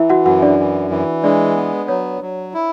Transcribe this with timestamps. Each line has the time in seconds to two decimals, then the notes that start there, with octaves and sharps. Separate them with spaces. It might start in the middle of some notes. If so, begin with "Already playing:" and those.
Already playing: E3 E4 E5
0.10 F#4 F#5
0.26 F#2 F#4 F#5
0.42 D4 D5
0.59 E3
0.91 E3
1.23 G#3 D4 D5
1.56 B3
1.88 F#3 C#5
2.22 F#3
2.54 E4